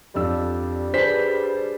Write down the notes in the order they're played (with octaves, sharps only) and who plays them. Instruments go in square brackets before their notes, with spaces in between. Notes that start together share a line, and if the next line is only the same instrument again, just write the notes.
[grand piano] F2 D4 E6 [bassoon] G3
[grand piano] D4 G#4 B4 [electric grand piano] C5 B6